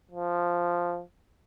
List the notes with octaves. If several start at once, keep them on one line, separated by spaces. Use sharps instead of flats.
F3